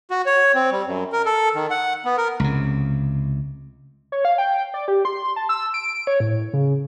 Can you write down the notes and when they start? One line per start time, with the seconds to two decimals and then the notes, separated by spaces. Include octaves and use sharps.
0.11 F#4
0.26 C#5
0.54 C4
0.72 G3
0.86 F#2
1.12 A#4
1.26 A4
1.55 D#3
1.71 F#5
2.05 B3
2.18 A#4
2.40 C#2 C3
4.12 C#5
4.25 F5
4.38 G5
4.74 D5
4.88 G4
5.05 C6
5.36 A5
5.49 E6
5.74 D7
6.07 C#5
6.20 A2
6.53 C#3